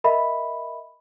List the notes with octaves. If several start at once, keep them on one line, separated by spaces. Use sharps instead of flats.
A#4 D#5 E5 B5